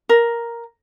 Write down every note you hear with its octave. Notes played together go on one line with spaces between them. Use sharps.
A#4